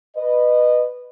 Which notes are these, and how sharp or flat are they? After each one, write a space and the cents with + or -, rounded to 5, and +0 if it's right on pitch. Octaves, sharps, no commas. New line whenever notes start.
B4 +0 D#5 -25